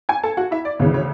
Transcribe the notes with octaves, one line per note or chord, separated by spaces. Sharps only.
G#5 G#6
A4 A5
F#4 F#5
E4 E5
D5
D2 C#3 E3 C#5
C#5